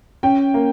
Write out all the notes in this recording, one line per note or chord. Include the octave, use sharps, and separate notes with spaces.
C#4 G5
A#3